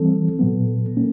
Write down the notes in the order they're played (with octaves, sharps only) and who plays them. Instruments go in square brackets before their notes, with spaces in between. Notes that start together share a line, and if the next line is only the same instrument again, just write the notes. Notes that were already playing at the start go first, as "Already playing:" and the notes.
Already playing: [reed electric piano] E3 G3 C4 A4
A#2 F#3 B3
A#3 C#4